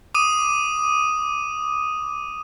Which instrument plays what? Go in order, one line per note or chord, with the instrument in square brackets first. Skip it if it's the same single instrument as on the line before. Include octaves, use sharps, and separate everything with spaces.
[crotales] D6 D#6 D#7